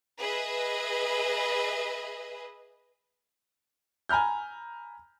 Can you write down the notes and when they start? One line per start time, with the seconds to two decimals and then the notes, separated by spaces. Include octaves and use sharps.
0.19 G#4 B4 D#5 E5
4.09 G#5 A#5 B5 F6 G6